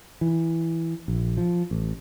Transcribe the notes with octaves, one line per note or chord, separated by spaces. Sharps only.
E3
A#1
F3
A1